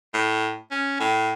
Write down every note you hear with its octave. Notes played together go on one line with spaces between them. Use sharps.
A2
C#4
A2